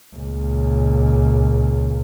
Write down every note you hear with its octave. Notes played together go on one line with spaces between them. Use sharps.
C#2 A#2